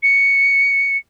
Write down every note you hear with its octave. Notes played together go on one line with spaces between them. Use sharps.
C#7